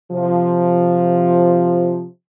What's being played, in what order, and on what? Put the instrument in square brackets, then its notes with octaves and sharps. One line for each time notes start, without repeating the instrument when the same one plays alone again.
[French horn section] C3 F3